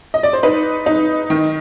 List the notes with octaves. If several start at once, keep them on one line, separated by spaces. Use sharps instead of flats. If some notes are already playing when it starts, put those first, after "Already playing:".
D#5
D5
C5
D#4 B4
D#4
D#3